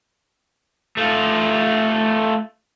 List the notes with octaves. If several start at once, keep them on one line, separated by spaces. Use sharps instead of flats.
A3 F4